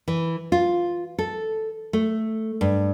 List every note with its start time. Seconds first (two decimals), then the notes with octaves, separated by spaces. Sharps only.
0.08 E3
0.52 F4
1.18 A4
1.93 A3
2.61 G2